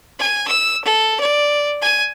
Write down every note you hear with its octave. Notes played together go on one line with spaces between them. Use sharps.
G#5
E6
A4
D5
G#5